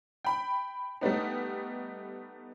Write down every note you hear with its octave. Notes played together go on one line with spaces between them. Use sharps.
G5 B5
G3 A3 B3 D#4